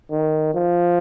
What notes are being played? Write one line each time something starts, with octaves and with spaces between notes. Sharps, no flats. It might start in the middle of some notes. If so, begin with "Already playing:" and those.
D#3
F3